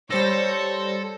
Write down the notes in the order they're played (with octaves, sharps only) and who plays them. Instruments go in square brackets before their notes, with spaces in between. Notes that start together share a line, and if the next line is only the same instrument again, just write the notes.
[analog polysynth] G3 C5 A#6 [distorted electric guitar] A4 [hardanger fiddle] C#5 A5